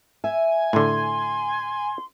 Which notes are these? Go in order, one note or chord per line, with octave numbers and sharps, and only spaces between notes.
E5 G#5
A2 D3 C6